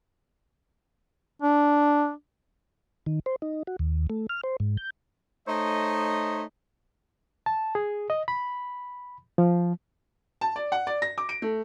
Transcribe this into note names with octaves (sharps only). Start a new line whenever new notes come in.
D4
D#3
C5
D#4
F#4
D#2
A3
F6
C5
G#2
G6
A3 D#4 C5 C#5 D#5
A5
G#4
D#5
B5
F3
A5
D5
F#5
D5
A#6
D6
D7
A3